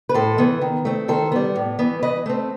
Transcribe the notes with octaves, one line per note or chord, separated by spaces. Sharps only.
B4
A2 A4 C5
E3 B3
D#3
A3 C4
D#3 A4 C5
G3 B3
A2
E3 B3
E3 B4 D#5
A3 C4